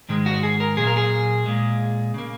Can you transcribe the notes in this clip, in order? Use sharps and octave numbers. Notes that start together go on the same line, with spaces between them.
G#2 D#3 G#3
F#4
G#4
A#4
A#2 F#3 A#3 G#4
A#4
G#4
A#2 G#3
C#3 A#3